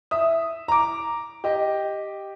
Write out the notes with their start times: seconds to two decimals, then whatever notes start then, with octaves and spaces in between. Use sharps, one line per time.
0.11 E5 D#6
0.68 A#5 D6
1.44 G4 D#5